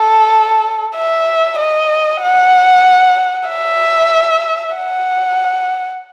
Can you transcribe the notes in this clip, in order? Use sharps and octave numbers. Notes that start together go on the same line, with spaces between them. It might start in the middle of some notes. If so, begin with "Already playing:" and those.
Already playing: A4
E5
D#5
F#5
E5
F#5